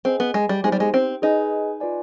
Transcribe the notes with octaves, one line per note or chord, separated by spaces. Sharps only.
C4 G#4 B4 D#5 G#5
B3
G#3
G3
G#3 B3 D#4 G4 C5
G3
G#3
C4
D#4 G#4 B4 D#5 G#5
F4 B4 D5 G#5